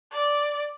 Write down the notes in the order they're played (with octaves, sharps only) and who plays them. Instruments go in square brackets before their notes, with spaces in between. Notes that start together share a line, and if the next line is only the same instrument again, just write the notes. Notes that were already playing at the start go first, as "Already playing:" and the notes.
[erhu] D5